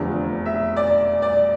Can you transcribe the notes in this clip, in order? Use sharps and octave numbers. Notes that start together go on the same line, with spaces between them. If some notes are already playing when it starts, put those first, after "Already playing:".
Already playing: F1 E2 D3 F3
E5
D5
D5